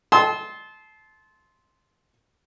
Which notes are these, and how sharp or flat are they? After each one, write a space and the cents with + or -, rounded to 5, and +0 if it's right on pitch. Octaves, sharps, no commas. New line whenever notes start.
A5 -25 C6 +0 E6 -45